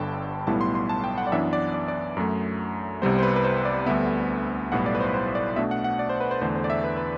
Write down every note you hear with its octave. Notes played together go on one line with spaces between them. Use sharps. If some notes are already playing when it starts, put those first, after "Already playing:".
Already playing: G1 G2 D3 G5 A5 B5
B1 A2 G3 B3 E4 A5
C6
C6
A5
G5
F#5
D5
F#2 E3 B3 D4 E5
D5
D5
D5
F#2 F#3 A3
C2 C3 G3 B3 C5
C5
B4
B4
C5
D5
D2 D3 G3 B3 E5
B1 A2 G3 B3 E4 F#5
D5
B4
C5
B4
C5
D5
B2 A3 D4 E5
F#5
F#5
D5
C5
B4
C5
E2 D3 A3 C5
C5
D5
E5
B4
B4